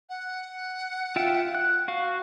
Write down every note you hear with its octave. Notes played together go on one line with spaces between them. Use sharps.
F#5
F4 E5 G5
F#6
F#4 F5